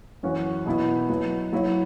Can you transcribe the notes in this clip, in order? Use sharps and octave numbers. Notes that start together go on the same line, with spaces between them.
F#2 E3 C#4 F#4 C#5
B2 B3 E4
F#3 E4 B4
F#3 E4 C#5